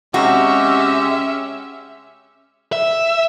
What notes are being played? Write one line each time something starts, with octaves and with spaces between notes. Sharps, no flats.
C3 G#3 C#4 F#4 G4 E5
E5